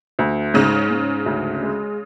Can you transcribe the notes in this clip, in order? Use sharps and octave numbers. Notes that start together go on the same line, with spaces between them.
D2
G#2 C#3
G#2
D2
G#3